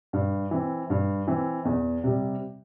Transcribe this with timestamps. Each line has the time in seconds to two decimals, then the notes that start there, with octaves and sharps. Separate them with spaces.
0.13 G2
0.51 E3 C4
0.90 G2
1.27 E3 C4
1.65 E2
2.04 C3 G3